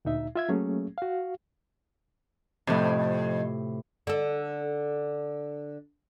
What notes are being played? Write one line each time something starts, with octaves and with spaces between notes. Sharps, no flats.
D2 A#2 D#4 E5
F4 E5 G#6
F#3 A3 A#3 C#4 G#4
F#4 F5
F2 A2 C3
D3 A4